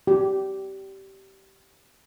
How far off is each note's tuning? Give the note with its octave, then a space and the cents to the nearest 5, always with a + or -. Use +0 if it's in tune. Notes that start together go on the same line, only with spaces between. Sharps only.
G4 -20